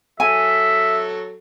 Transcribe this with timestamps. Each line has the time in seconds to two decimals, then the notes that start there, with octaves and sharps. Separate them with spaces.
0.20 F#3 A4 E5 G#5